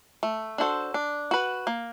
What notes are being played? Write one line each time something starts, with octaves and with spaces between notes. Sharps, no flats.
A3
D4 F#4 A4 C5
D4
F#4 B4
A#3